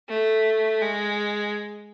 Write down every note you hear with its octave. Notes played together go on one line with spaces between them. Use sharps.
A3
G#3